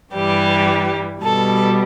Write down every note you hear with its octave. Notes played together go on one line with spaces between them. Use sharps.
G2 E3 G3 G4
B2 G3 A4